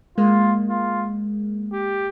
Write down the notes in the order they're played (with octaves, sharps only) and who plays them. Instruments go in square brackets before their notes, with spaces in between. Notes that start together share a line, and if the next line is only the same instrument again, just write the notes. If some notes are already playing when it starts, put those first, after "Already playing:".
[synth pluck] G#3 A#3 [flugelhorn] F4
[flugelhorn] F4
G4